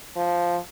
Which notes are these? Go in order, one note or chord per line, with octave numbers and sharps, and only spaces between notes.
F3